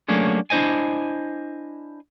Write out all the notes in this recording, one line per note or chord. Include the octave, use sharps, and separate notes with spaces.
F#3 A3 A#3 C#4 D4 G#4
D4 E4 C5 D#5 G#5